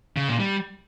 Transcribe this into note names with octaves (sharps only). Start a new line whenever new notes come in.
C#3
A#2
G3